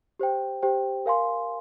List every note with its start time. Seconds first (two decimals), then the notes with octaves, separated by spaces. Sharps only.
0.19 G4 C5 G5
0.62 G4 C5 G5
1.06 A#4 F5 G#5 C6